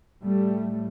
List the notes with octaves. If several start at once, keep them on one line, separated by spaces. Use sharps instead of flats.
A2 G3 A3